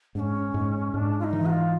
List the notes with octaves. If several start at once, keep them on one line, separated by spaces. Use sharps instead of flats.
G#2 C#4 D4
G#2
G#2 D4
F4
D#4
E3
F#4
F4